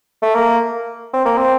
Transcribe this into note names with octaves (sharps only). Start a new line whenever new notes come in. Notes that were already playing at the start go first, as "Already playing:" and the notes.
A3
A#3
C4
A#3
C4